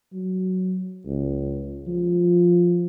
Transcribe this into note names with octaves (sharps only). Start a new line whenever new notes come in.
F#3
C#2
F3